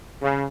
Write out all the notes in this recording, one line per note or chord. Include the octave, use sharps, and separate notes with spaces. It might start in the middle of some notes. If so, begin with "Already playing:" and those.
C#3